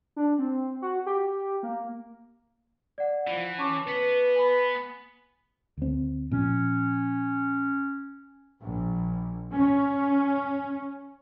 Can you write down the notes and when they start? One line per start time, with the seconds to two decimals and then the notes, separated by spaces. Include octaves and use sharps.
0.16 D4
0.39 C4
0.82 F#4
1.06 G4
1.63 A#3
2.98 D5 F#5
3.28 E3 F3
3.58 C#4 A5 C#6 D6
3.87 B3 B4
4.35 G#5 B5
5.77 D2 C4
6.31 A#2 F3 C#4
8.64 A#1
9.55 C#4